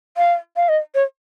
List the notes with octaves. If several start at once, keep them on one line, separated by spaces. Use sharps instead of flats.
F5
F5
D#5
C#5